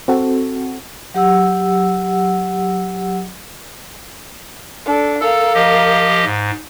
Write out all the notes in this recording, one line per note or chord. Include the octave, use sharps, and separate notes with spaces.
C4 F#4 A4
F#3 G4 F#5 E6
D4 A4
A4 A#4 F5
F3 G4 D#5
G#2